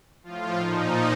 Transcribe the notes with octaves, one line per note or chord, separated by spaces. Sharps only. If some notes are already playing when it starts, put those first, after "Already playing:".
A2 F3 F4
A#2 F3 D#4